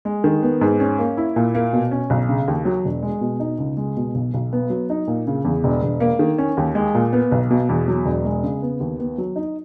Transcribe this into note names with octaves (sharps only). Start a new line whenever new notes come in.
G#3
D#3
B3
G#2
C#4
A#3
E4
A#2
A#3
B2
C#4
B1
C#3
D#2
F#3
E1
G#3
B2
D#4
C#2
G#3
B2
B1
B1
B3
F#3
D#4
A#2
C#3
E2
E1
E1
A#3
D#3
C#4
D#2
G#3
A#2
B3
B1
B2
E2
F#3
E1
G#3
C#3
B3
D#2
B3
F#3
D#4